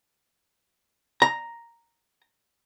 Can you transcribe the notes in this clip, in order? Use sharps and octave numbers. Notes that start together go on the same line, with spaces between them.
A#5